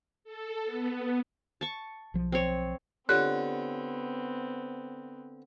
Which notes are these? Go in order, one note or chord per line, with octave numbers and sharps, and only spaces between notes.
A4
B3
A5 C#6
B1 F3
C4 C#5
D3 B3 C4 F4 G4 C#5 F#6